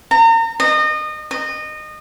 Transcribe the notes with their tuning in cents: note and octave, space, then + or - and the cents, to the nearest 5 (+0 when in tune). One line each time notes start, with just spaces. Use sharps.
A#5 -35
D#5 -30
D#5 -25